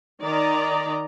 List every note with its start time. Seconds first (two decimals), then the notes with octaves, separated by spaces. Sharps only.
0.23 D#3 D5 D#5 A#5